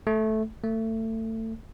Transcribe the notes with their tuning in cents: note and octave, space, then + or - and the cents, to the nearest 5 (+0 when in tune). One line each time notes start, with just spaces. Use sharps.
A3 -10
A3 +25